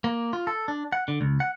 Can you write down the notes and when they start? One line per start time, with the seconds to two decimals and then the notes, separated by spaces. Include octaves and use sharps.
0.04 A#3
0.33 F4
0.47 A4
0.68 D4
0.93 F#5
1.08 D3
1.21 C#2
1.40 F#5